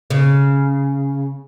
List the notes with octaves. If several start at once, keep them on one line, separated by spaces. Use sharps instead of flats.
C#3